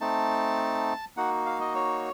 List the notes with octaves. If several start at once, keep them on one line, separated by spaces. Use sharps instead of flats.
A3 C4 D#4 A5
A#3 D#4 F#4 F#5
F5
D#5
C#5